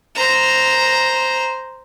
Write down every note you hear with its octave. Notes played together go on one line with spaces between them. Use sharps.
C5 A#5